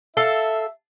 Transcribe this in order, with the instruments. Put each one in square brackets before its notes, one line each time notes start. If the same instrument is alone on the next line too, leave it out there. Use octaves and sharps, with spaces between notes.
[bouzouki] A4 F5 A5 [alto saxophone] E5